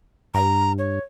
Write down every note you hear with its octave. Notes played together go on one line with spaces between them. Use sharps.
G2 A#5
C#5